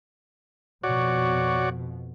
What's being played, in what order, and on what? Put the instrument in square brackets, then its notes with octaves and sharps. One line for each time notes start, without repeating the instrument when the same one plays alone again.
[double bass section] F2 B2 [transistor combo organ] F#4 C#5 D5